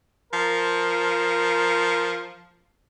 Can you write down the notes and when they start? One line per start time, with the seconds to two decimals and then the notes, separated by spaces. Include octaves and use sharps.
0.33 F3 A#4